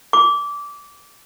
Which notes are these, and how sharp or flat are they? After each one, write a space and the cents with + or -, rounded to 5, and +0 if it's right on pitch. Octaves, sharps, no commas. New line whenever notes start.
D6 -20